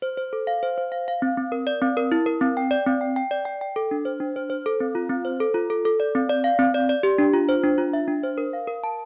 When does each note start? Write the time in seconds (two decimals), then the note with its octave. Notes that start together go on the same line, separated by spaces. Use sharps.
0.02 C5
0.17 C5
0.33 A4
0.47 F5
0.63 C5
0.78 C5
0.92 F5
1.08 F5
1.22 C4
1.37 C4
1.52 A#4
1.67 D5
1.82 C4
1.97 A#4
2.12 E4
2.26 A#4
2.41 C4
2.57 G5
2.71 D5
2.86 C4
3.01 G5
3.16 G5
3.31 D5
3.45 G5
3.61 G5
3.76 A4
3.91 D4
4.05 C5
4.20 D4
4.36 C5
4.50 C5
4.66 A4
4.80 C4
4.95 F4
5.09 C4
5.25 C5
5.40 A4
5.54 F4
5.70 A4
5.85 A4
6.00 D5
6.15 C4
6.29 D5
6.44 F5
6.59 C4
6.74 D5
6.89 D5
7.03 G4
7.18 D4
7.33 F4
7.49 C5
7.64 D4
7.78 F4
7.93 E5
8.08 D4
8.23 C5
8.38 A#4
8.53 F5
8.67 A#4
8.84 A5